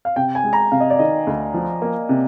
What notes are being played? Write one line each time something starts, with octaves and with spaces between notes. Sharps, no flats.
F5
C3 G5
G#5
G#3
A#5
C3 F5
D#5
D5
D#3 D#5
D2
F3
A#3
C3